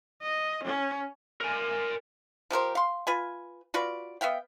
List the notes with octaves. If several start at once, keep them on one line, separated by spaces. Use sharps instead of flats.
D#5
C#4
A#4 G#5
F3 G4 A#4 C5
F5 C6
F4 B4 G#5
F4 F#4 B4 D5
B3 E5 F5 G5